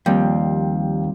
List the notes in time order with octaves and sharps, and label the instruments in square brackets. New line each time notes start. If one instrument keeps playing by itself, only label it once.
[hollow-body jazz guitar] D#2 [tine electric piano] F3 A#3 G5 [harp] G3 C4 F4